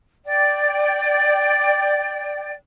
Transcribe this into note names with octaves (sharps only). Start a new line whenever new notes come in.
D5 G5